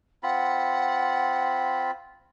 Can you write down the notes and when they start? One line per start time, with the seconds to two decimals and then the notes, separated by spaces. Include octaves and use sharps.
0.23 C4 F4 F#5 B5